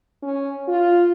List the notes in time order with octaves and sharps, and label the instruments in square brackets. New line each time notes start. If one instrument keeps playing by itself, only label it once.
[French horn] C#4
F4